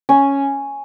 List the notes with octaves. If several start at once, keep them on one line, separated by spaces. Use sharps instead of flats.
C#4